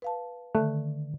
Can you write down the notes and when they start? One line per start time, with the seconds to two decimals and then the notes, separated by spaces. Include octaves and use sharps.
0.02 B4 F5 A5
0.55 D3 D#3 A3